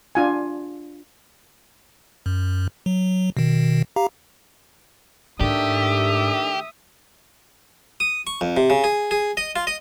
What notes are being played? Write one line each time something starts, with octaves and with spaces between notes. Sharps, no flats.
D4 F4 G#5
F#2
F#3
B2 D#3
G4 F5 A#5
G#2 D#3 A3 D4 G4 E5 D#6
D#6
C#6
F2
C3
C#3
G#4
G#4
D#5
F4
D#5